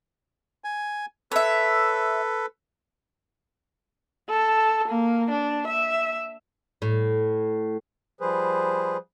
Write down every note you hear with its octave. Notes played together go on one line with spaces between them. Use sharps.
G#5
A4 B4 C#5 E5
A4
A#3
D4
E5
A2
F3 G3 G#4 B4 C5